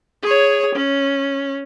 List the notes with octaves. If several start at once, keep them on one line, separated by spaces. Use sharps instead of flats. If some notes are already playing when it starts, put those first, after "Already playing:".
G#4 C#5
C#4